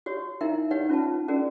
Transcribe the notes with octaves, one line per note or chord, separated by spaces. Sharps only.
F#4 G4 C#5
D#4 E4 A#4 E5 G5
D#4 G4 B4 C#5 F#5
C#4 F4 B4 A5
C#4 F#4 G#4 A#4 D5